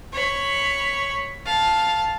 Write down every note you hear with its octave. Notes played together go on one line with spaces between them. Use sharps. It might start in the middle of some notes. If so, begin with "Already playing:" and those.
C#5 B5
F5 A5